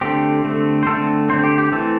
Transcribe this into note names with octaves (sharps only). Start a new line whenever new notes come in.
D3 A3 C4 G4
D3 A3 C4
C5
D3 A3 C4 A4
D3 A3 C4 C5
G4
G4
E3 A3 C4 A4